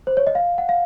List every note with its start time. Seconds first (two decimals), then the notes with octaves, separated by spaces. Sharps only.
0.07 C5
0.17 C#5
0.27 D#5
0.35 F5
0.58 F#5
0.69 F5